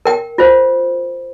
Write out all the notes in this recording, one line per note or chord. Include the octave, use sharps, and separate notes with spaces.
A#4 G5
F4 C5